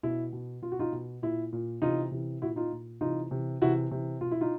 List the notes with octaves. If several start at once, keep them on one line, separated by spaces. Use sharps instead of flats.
B2 E4
B2
B2 F4
F#4
D#4 F4
B2
A#2 E4
A#2
C3 E3 D#4 F4
C3 E3
A#2 E4 F#4
D#4 F4
A#2
C3 E3 D#4 F4
C3 E3
C3 E3 E4 F#4
C3 E3
B2 F4
E4
D#4 F4